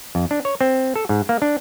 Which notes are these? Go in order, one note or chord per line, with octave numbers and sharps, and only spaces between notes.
F2
D4
C#5
C4
A4
G#2
A#3
D4